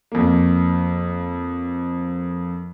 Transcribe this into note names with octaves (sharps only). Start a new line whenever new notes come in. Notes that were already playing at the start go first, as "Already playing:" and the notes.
F2 A#3